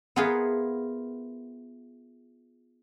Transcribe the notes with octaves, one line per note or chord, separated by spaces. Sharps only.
B3 E4 F4 G#4 A#4 B4